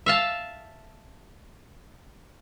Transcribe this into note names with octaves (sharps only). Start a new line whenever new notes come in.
E5 F5 A5